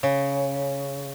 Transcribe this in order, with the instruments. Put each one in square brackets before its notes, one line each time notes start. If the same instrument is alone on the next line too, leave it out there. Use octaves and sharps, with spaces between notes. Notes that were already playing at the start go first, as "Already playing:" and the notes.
[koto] C#3